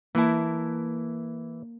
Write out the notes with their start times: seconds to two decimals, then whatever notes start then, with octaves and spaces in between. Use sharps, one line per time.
0.15 E3 A#3 E4 A5